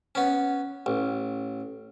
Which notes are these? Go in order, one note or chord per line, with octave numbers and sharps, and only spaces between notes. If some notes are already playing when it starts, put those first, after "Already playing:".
B3 C#4
A1